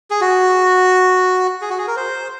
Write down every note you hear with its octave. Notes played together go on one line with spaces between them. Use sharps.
G#4
F#4
G#4
F#4
G#4
A#4
C5